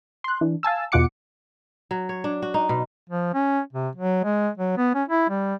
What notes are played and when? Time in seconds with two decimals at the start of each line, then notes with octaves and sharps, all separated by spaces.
0.24 C6 F#6
0.41 E3 D4
0.63 F5 G#5 A5 E6
0.92 E2 B2 F4 F#5 D6 C#7
1.91 F#3
2.09 C#5
2.24 D4
2.42 F#4
2.54 D#4
2.69 B2
3.10 F3
3.34 C#4
3.73 C3
3.96 F#3
4.24 G#3
4.58 F#3
4.78 B3
4.95 C#4
5.09 E4
5.30 G3